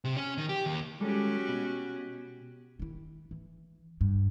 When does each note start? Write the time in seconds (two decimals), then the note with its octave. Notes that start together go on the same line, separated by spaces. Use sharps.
0.04 C3
0.17 C#4
0.38 D#3
0.49 G4
0.66 D#2
1.00 G3 G#3 C#4 F#4 G4 A4
1.48 B2
2.79 D#3 E4
3.31 E3
4.01 G2